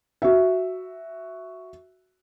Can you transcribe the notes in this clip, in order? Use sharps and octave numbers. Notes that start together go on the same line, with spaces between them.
F#4 E5